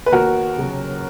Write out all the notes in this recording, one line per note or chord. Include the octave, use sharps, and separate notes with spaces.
B4
D#2 F#4 A#4
C#3 F#3